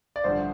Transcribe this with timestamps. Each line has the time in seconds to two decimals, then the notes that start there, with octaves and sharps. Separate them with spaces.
0.16 D5
0.24 A1 G2 D3 F3 C5